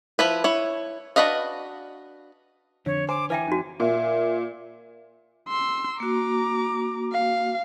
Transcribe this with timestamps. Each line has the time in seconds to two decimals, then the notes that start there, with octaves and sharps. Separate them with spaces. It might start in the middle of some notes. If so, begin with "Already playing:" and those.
0.19 F3 E4 B4
0.44 E4 C#5
1.16 D4 F#4 B4 D#5 F5
2.86 F2 D3 C#5
3.09 C5 G#5 D6
3.30 E3 B4 E5 G5 G#5
3.47 F2 D#4 F#4
3.80 A#2 E5
5.48 C6 E6
6.00 A#3 F#4 A#5 D6
7.12 F5